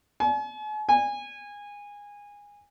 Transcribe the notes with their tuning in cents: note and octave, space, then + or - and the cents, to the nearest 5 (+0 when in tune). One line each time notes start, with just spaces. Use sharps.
G#5 +45
G#5 -20